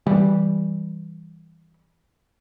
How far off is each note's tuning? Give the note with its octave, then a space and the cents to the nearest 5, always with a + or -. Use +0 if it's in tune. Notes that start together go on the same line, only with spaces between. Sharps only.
E3 -10 G3 +0